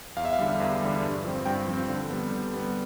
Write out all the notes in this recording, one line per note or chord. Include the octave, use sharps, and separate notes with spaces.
E2 F5
E5
F5
D3 G3
E2
D3 G3
G2
F3 C4
G2 G5
F3 C4
D3
G3 B3
D3
G3 B3